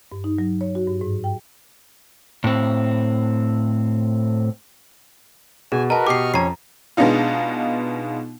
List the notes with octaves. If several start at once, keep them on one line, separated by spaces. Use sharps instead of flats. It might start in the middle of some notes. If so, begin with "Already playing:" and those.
G2
D#4
F#3
C#5
F#4
G2
G#2
G5
A2 C4
B2 G#4 G#5
F#4 A#4 B4 D#5 A5 A#5
B2 G4 D#5 C#6 D6 F6 C7
F2 C#4 C#5 A#5 C7
B2 G#3 B3 D4 D#4 F4